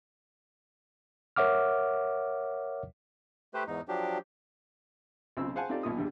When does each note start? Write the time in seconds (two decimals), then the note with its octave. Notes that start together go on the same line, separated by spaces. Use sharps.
1.36 A#4 C#5 E5 F#5 D6 F6
3.54 A3 G4 B4 C5
3.67 E2 G#2 D#4
3.88 F3 F#3 D4 G4
5.37 B1 C#3 C4 E6
5.55 G#4 C5 F5 F#5 G#5 A5
5.69 C4 D#4 F4 G4 A4 D5
5.83 B1 A#2 D#6
5.97 E2 G2 D3